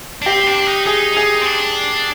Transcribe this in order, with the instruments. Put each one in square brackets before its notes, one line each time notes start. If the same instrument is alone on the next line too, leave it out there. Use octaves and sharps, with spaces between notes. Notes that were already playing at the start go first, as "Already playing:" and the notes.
[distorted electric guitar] D4
[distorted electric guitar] C4 [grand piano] G4
[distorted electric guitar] D4
D#4
[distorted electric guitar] D#4 [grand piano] G#4
[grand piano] G#4
[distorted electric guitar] C4
D4